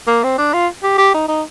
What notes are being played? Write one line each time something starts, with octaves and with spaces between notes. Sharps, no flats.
A#3
C4
D4
F4
G4
G4
D#4
D#4